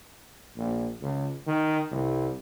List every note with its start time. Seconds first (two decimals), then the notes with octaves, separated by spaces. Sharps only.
0.57 A#1
1.02 C#2
1.47 D#3
1.92 C2